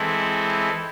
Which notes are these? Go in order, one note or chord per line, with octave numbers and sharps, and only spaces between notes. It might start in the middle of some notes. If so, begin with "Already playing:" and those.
Already playing: E3 G#3 C4 E4 A4